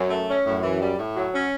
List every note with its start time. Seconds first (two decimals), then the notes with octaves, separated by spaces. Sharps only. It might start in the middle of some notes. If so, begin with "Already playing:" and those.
Already playing: F#2
0.09 A3
0.28 C#4
0.45 F#2 A2
0.62 E3
0.80 G3
0.98 A2
1.15 F#3
1.33 C#4